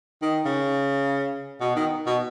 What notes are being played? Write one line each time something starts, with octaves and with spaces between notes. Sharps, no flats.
D#3
C#3
B2
D#3
B2